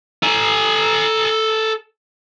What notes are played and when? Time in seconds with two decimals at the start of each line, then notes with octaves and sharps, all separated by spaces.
0.23 A4 G#5